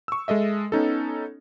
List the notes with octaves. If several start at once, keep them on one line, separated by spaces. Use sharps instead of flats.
C#6 E6
G#3 A4 D#5 E5
B3 C#4 D#4 A4